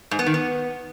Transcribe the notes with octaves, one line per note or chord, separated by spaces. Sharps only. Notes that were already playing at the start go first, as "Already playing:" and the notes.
G#2
B3
D#3
B3